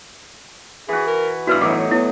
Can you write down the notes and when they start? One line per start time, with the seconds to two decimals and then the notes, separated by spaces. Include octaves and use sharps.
0.89 E3 F#4 G#4
1.07 A#4
1.47 G2 B2 E4 F#4 B4 E6
1.61 A2 E3 F#3 D#4 F#5 D6
1.91 B3 E4